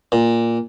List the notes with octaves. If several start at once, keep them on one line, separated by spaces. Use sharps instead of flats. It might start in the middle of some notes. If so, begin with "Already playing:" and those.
A#2